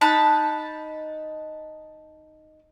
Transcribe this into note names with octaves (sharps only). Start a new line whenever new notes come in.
D#4 A5 B5 F#6